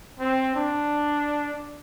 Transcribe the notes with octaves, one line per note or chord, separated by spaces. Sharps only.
C4
D4